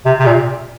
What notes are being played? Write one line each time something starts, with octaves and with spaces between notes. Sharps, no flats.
C3
C3
A#2